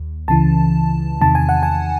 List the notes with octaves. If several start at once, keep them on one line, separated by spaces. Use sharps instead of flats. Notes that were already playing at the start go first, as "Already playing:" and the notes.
Already playing: D#2
C#2 C#3 E3 A5
E2 C3 D#3 A5
G#5
F#5
G#5